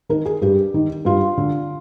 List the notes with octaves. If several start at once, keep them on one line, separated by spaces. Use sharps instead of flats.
D#3 A#4
G#4
G2 G4
D#3
G2 F4
D3